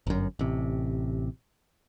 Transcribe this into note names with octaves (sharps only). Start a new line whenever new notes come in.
G1 F#2
A1 C3